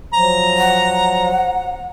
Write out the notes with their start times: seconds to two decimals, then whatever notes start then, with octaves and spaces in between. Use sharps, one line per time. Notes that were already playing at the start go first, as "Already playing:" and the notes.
0.14 F3 F#3 A#5
0.58 F#5